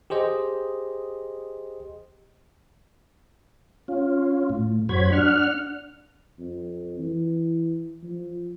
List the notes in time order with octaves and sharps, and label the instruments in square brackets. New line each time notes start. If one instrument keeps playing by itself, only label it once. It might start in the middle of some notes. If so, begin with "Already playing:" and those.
[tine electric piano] G4 G#4 C5 D#5
[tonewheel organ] C#4 F4
A2
F#2 F#4 C5 C#5 B5 G#6
D4 F#5 F6
[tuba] F2
E3
F3